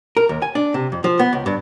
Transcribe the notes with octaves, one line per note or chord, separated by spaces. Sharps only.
A#4
D#2
G#5
D4
C3
F2
F3
B3
C#2
G2